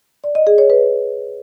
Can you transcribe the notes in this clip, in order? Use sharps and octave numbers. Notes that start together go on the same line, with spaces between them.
D5
D#5
G#4
C#5
B4